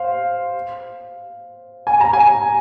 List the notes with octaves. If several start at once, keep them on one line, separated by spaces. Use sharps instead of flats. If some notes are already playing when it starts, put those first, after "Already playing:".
Already playing: C5 F5
G#5
A#5
G#5